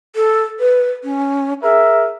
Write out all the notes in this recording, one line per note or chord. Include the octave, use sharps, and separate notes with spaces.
A4
B4
C#4
G#4 A#4 E5